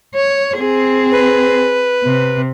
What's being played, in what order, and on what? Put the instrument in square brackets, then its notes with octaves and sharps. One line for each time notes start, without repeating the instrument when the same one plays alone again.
[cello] C#5
C4 G#4
[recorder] B4
[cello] C3